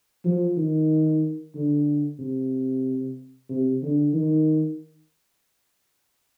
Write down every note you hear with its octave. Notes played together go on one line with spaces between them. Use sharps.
F3
D#3
D3
C3
C3
D3
D#3